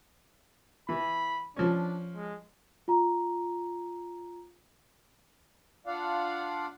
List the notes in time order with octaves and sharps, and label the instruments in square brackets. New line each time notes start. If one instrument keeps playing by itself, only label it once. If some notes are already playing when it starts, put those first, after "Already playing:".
[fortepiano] E3 [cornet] B5
[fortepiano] F3 C#4 [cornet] D4
[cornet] G#3
[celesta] F4 A#5
[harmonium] D4 F4 D5 F5 F#5